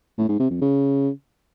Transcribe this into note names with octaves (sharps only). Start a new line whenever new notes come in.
A2
G#2
C3
F2
C#3